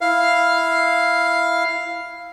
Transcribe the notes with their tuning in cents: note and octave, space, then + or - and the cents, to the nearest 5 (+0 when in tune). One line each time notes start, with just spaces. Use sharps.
E4 +0 F5 +0